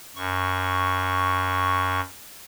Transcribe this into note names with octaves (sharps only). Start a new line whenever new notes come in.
F#2 C#6